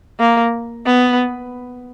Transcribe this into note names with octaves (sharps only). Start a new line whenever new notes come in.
A#3
B3